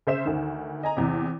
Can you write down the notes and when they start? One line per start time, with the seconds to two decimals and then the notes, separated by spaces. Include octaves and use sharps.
0.07 C#3 C5 E5 E7
0.25 D2 D#3
0.83 D#5 G#5 A#5
0.97 E2 C3